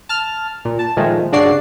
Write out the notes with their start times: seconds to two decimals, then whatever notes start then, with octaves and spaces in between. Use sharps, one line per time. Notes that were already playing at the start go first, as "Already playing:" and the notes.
0.09 A5 F6
0.65 A#2
0.79 A5
0.97 A#2 D#3 F3 G#3 A3
1.32 G2 C#3 D4 F#4 D5 C7